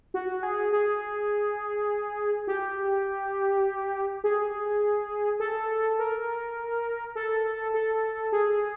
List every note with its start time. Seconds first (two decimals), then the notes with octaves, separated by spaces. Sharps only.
0.14 F#4
0.43 G#4
0.73 G#4
2.47 G4
4.24 G#4
5.40 A4
5.99 A#4
7.15 A4
7.74 A4
8.32 G#4